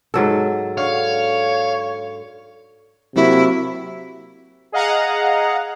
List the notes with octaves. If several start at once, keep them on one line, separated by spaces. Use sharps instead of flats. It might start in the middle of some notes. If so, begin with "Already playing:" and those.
G#2 F#3 A4
D3 C#5 F5
C3 F#3 A#3 E4 F#4
G#4 D#5 F5 F#5 A#5